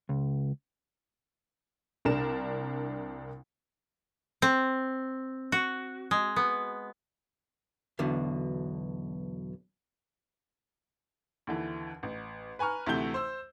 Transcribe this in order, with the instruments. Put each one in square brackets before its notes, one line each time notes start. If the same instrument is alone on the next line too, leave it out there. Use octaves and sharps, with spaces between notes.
[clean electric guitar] C#2
[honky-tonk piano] C2 D4 A#4 E7
[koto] C4
F#4
G#3
B3
[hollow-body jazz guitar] B1 E2 B2 D3
[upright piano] D#2 D3 E3
A1
B4 G#5 A#5 C#6 F6
D2 C3 E3 A3 G6 G7
C5 E6